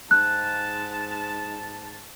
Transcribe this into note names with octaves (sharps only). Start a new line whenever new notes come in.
G#2 A5 F#6